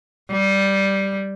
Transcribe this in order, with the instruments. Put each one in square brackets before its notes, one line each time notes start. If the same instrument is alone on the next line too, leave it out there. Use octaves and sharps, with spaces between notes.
[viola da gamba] G3